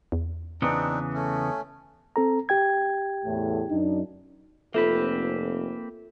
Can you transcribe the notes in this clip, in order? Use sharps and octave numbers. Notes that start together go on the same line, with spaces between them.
E2
C#3 E3 B3 C4 D4 D#4
A3 C#4
C4 A4 A#5
G4 G5 G#6
E2 A2
F#2 D4 D#4
F1 A#3 C4 F4 A4 B4 E5